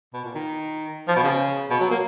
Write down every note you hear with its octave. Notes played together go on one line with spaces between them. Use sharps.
B2
A#2
D#3
F3
B2
C#3
B2
F#3
A#3